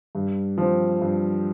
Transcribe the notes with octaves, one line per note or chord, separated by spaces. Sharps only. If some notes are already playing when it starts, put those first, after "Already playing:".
G2
F3 C4
G2